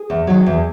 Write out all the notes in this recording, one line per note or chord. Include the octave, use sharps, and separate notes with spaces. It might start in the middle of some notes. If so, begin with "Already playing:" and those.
Already playing: G#4
E2
D#3 F#3
E2